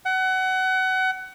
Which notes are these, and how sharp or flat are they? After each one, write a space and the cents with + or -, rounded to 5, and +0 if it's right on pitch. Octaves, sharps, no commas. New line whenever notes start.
F#5 +25